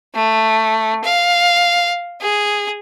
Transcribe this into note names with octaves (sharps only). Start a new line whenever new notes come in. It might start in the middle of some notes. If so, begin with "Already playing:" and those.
A3
F5
G#4